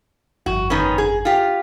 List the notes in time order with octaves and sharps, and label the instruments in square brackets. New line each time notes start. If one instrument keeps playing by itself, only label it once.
[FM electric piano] G1 F2 [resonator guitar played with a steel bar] F#4
[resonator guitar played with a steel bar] D#3 B3 C#4
G#4
F4 G4